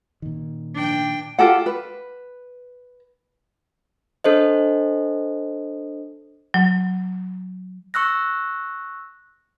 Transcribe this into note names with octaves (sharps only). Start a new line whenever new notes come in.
A#2 D#3
D4 G5
F4 G4 A4 F#5
B4
D4 A4 C5 D#5
F#3
C#6 E6 F#6 A#6